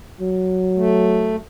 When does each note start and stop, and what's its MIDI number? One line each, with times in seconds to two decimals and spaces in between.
0.21 1.44 54
0.76 1.36 57